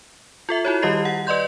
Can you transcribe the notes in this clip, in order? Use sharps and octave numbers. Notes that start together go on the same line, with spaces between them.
F4 A4 E5
E4 F#4 C#5
D#3 G3 G4 D#5 C7
F#5
B4 D5 D#5 C6 G6